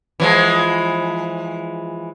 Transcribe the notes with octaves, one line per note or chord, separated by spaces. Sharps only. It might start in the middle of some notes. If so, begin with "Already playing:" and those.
E3 F3 G#3